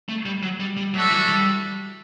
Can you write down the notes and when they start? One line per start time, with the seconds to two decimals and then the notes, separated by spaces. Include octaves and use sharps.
0.09 A3
0.26 G3
0.43 F#3
0.60 G3
0.77 G3
0.94 F#3 A3 D4 F#4 A4 E5
1.11 E3
1.28 G3